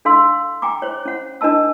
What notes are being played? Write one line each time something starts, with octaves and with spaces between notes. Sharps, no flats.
D4 A4 F5 C6 E6
G5 G#5 A#5 D6
C5 C#5
C#4 F#5
D4 A#4 D#5 A5 E6